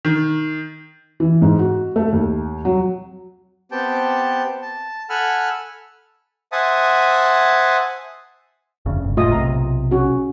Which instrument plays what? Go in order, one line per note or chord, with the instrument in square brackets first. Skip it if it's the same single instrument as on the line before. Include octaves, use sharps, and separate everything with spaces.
[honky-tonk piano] D#3
[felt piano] E3
G#2
F#4
A3
D#2
F#3
[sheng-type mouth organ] B3 C4 G4 G5 A5
A5
A4 F#5 G#5 B5 E6 F6
C5 E5 F#5 G#5 A5 D#6
[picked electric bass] F1 D2 C#3
G1
[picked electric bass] F#1 A2 A3 [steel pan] F4 D#5 D#6
[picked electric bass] B1 C3 [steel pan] A#5
[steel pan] C#4 F#4